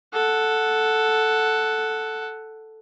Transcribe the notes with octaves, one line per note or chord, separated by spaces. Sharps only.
A4 F#5